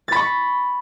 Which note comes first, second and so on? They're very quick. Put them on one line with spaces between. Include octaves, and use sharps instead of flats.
A6 B5 C#6